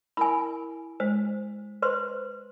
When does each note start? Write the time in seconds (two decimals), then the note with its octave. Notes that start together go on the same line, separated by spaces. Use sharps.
0.17 E4 A#4 G#5 B5
1.00 G#3 C5
1.82 B4 C5 C6